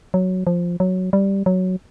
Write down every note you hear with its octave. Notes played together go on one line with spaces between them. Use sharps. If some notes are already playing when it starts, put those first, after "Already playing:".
F#3
F3
F#3
G3
F#3